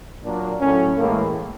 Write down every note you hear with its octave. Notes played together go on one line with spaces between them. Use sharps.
A#2 F#3 A#3 D4
A2 F#3 A3 C#4
A2 E3 G#3 A#3